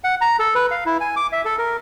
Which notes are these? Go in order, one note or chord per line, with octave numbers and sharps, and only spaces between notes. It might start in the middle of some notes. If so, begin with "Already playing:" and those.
F#5
A#5
A4
B4
F5
E4
G#5
D6
E5
A4
A#4